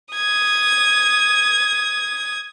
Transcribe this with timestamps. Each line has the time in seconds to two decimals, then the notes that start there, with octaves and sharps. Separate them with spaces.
0.14 D#6 G#6